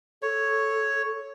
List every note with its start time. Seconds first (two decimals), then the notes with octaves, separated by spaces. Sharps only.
0.22 A4 C#5